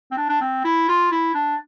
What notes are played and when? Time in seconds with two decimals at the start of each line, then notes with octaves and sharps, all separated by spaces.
0.11 C4
0.17 D4
0.29 D4
0.41 C4
0.64 E4
0.89 F4
1.12 E4
1.35 D4